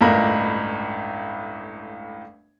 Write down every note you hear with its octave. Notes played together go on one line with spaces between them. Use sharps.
G1 C#2 A2 A#4 B5